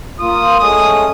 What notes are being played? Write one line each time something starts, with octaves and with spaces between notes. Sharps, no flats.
A#3 F4 D#6
G#3 A3 C#4 D#6